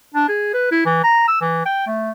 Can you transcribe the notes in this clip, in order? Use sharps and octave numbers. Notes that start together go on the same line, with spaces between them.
D4
G#4
B4
E4
E3
A#5
E6
E3
G5
A3